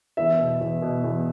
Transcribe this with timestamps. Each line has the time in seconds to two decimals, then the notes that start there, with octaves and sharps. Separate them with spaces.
0.17 E2 E5
0.39 B2
0.61 E2
0.82 B2
1.04 E2